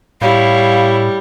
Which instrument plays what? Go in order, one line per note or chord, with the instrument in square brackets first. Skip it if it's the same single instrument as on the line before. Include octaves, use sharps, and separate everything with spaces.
[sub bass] A2 [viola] G3 [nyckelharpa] E4 C#5 [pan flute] F5